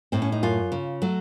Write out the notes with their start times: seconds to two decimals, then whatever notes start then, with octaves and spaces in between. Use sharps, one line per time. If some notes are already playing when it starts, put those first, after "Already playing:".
0.12 A2 C4
0.22 C#4
0.32 D#4
0.43 F#2 F4
0.72 C#3
1.02 F#3 A3